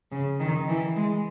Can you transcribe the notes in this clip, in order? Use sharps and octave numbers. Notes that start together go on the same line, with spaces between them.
C#3
D#3
E3
G#3